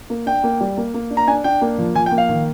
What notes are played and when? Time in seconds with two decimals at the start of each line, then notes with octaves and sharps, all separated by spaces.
0.10 A#3
0.26 D4 G5
0.44 A#3
0.61 G3
0.77 A#3
0.94 A#3
1.11 D4
1.17 A#5
1.27 D4 G#5
1.44 D4 G5
1.62 A#3
1.78 F3
1.95 F3 G#5
2.06 G5
2.12 A#3
2.18 F5
2.29 D#3